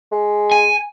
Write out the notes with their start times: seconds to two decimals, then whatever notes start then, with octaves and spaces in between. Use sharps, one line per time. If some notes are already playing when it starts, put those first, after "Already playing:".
0.12 G#3
0.52 G#5